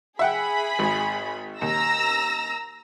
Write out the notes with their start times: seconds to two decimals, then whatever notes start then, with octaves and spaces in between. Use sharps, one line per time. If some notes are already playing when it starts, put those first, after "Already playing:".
0.19 G#4 E5 F#5 G5 B5
0.79 G#1
1.62 D#2 A#5 E6 A#6